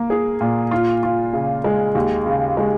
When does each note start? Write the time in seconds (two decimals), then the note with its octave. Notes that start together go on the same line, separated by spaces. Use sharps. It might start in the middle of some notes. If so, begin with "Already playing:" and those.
Already playing: A#3
0.10 G#4
0.41 A#2
0.71 F4
1.03 F4
1.33 C#3
1.64 G#3
1.95 D#2
2.26 C#3
2.57 G#3